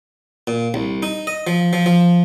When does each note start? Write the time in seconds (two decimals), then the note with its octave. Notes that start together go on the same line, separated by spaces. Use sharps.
0.47 A#2
0.74 C2
1.03 D#4
1.27 D#5
1.47 F3
1.73 F3
1.86 F3